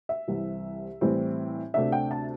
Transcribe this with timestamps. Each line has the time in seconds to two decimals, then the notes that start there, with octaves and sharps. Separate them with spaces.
0.09 E5
0.27 C2 C3 E3 G3
1.01 A2 E3 G3 C4
1.74 D2 C3 A3 D4 E5
1.92 G5
2.11 A5